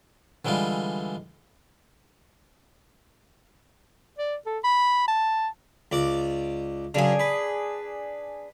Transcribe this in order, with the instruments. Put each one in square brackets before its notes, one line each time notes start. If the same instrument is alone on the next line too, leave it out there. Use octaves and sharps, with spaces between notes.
[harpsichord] D3 E3 G3 G#3 F4
[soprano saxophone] D5
A4
B5
A5
[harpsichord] C#2 D5 D6
[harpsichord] F#2 C#3 [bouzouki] D4 G#4
[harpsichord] B4